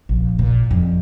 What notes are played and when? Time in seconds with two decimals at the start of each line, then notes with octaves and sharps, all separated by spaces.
0.09 A#1
0.39 A#2
0.71 F2